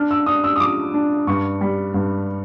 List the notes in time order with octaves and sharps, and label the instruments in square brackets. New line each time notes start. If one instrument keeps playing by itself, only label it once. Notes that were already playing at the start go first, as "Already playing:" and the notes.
Already playing: [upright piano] D4 F6
E6
D4 D#6
E6
D#6
F3 D6
D4
G2 C#6
G3
G2